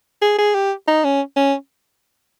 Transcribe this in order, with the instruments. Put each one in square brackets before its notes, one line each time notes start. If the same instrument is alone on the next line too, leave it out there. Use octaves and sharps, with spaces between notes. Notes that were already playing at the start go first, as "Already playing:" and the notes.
[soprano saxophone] G#4
G#4
G4
D#4
C#4
C#4